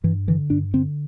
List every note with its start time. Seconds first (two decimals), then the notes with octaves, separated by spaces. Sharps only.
0.04 G2 E3
0.28 D3 E3
0.50 G2 D4
0.73 D3 C4